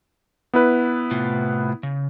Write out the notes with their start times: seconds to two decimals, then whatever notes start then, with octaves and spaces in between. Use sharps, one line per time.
0.54 B3 E4 B4
1.11 A2 C3 F4
1.83 C#3